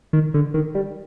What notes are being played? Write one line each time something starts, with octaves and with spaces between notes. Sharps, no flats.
D#3
D3
D#3
G3